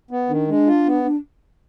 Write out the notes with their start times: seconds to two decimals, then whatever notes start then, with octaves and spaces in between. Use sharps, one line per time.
0.11 B3
0.29 D#3 D4
0.47 G#3 D4
0.67 F4
0.86 B3